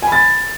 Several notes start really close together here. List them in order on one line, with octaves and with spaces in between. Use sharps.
G#5 B5 A6